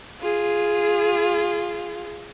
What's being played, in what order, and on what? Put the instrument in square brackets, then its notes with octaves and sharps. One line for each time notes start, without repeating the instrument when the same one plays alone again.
[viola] F4 G#4